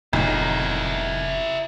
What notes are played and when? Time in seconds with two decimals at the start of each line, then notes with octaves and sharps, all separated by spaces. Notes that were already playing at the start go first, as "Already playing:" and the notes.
0.13 F1 B1 A#2 C#3 E4 A#4